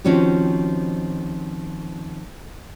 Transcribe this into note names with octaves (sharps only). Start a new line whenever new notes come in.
D#3 F3 C4 C#4 F#4 G4